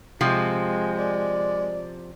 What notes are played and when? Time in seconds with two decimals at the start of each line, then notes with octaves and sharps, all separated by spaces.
0.21 C3 F3 G#3 C4
0.98 D5